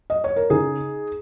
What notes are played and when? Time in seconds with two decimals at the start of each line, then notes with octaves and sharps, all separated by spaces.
0.10 D#5
0.24 C#5
0.36 A#4
0.50 C#3 D#4 G#4